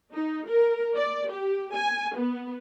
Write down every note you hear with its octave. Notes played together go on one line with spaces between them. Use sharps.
D#4
A#4
D5
G4
G#5
B3